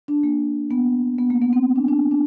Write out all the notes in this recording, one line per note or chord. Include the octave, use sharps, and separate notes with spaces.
D4
A#3
B3
B3
A#3
B3
C4
D4
D4
D4